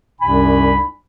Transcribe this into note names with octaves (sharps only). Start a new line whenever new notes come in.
C2 F#2 C3 D4 G#5 B5